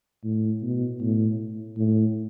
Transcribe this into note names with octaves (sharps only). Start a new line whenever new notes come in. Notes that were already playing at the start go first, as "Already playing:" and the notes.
A2
B2
A2
A2